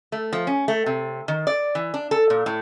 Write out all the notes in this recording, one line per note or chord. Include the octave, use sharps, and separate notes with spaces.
A3
F3
C#4
A3
C3
D#3
D5
E3
D4
A4
A#2
A2